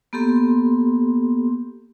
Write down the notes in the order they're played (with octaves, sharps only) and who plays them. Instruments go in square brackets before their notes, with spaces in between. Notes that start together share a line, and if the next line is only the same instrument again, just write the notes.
[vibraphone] A#3 B3 G4 A4 C6